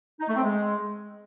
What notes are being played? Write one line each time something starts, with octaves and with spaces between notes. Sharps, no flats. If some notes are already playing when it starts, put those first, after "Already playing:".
D#4
A3
C4
G#3